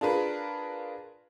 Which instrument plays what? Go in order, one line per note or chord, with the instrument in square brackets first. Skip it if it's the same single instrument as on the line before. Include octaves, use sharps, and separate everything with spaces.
[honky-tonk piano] D4 F4 G#4 A#4 B4